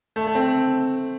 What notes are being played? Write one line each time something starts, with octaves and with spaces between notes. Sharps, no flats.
A3
A3
C4